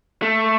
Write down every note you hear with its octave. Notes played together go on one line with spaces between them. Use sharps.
A3